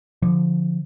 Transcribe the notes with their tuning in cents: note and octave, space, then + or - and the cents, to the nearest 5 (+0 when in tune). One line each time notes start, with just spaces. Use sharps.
D3 +0 F3 +0